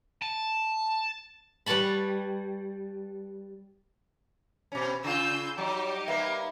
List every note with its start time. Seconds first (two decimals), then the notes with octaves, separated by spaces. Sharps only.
0.22 A5
1.66 G3 B4 C#5 A5 B5
4.72 B2 C#4
5.04 C#3 F4 G#5 E6 G6
5.58 F#3 G3 D#4 G4
6.08 A#3 B3 E5